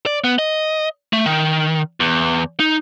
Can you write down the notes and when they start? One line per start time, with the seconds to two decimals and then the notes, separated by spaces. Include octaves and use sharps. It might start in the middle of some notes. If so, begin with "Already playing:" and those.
0.06 D5
0.24 B3
0.39 D#5
1.13 A3
1.26 D#3
2.00 E2
2.60 D#4